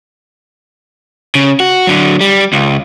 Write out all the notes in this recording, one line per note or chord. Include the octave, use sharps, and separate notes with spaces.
C#3
F#4
D3 F#3
G3
C#2